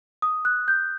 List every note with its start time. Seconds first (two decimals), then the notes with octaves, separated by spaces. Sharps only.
0.22 D#6
0.45 F#6
0.68 G6